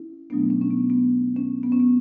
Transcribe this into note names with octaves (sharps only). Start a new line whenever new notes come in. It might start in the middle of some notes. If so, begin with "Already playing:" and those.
Already playing: C#4 E4
B2 F#3 A3 B3 D4
C#4
C#4
B3
B3
C#4
B3
C#4
B3